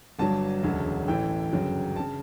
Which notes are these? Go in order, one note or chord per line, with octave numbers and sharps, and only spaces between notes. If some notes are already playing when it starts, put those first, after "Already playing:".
G1 G2 F#3 A5
E1 D2 C#3 F#3
A1 A2 E3 G5
G1 F#2 C#3 F#3
C#3 A5